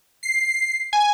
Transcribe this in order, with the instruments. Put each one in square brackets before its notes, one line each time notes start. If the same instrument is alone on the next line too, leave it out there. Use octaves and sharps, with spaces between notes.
[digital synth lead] C7
G#5